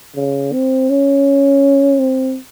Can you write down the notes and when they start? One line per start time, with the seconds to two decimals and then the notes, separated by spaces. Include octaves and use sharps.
0.16 C#3
0.52 C4
0.90 C#4
1.99 C4